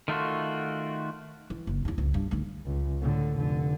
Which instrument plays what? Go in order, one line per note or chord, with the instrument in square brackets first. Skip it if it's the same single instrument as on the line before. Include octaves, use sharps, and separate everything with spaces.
[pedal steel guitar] D#3 A3 F4 F#4
[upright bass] E3
F#1
D#2 E4
C#2
G2
D2 D#3
[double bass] C#2
A2 D3
F1 D3